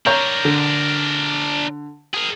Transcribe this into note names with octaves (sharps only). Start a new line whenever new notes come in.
D4 A#4 C#5 A#5 G6
D3
G#4 A#4